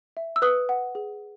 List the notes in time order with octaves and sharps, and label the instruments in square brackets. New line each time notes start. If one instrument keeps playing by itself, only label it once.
[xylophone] E5
E6
B4 D#6 F#6
F#5
G#4